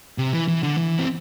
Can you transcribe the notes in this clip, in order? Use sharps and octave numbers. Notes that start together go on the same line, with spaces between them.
C3
E3
E3
D3
E3
C4